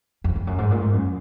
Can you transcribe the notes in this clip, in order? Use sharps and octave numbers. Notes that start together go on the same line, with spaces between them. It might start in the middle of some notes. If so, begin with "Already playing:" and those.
F2
F2
F#2
G#2
A#2
G#2
F#2